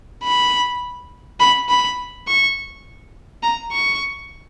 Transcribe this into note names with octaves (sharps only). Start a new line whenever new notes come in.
B5
B5
B5
C#6
A#5
C#6